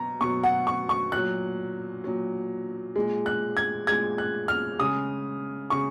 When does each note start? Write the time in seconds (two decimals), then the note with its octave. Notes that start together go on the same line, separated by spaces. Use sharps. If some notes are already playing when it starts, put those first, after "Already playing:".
Already playing: B2 F#3 A#5
0.21 B2 F#3 C#6
0.43 F#5
0.67 C#6
0.89 C#6
1.12 A#2 F#3 F#6
2.04 A#2 F#3
2.96 A#2 G#3
3.26 F#6
3.57 G#6
3.87 A#2 G#3 G#6
4.18 F#6
4.48 F6
4.79 C#3 G#3 D#6
5.70 C#3 C#6